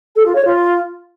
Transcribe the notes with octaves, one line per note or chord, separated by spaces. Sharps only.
A4
F4
C#5
F4